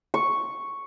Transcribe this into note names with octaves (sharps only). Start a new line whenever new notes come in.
C#6